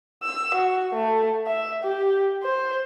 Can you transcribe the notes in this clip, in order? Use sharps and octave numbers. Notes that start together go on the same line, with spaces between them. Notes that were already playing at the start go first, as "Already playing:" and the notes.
E6
F#4
A3
E5
G4
C5